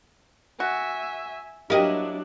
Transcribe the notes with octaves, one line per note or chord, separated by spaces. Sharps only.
F#4 E5 G#5
F#3 A#3 D4 E4 G4 D#5 G5